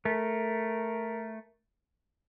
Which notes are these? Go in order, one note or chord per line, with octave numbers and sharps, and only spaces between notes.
A3 A#4